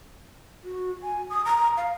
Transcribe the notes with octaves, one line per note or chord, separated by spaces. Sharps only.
F#4
G#5
D#6
A#5
F5